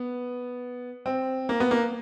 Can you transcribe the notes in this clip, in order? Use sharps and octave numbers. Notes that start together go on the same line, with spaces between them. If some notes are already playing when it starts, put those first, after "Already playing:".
Already playing: B3
C4
A#3
B3
A#3